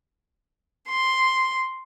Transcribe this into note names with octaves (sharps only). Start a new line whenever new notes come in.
C6